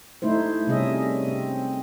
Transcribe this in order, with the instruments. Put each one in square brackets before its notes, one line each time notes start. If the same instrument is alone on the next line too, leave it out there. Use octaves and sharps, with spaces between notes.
[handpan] A3 D#4 E4 C5
C3 G3 C#4 G#4 D#5 E5
C4